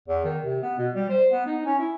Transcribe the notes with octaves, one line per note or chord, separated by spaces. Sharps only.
E2
D#3
C3
B3
B2
G3
C5
B3
D#4
C#4
E4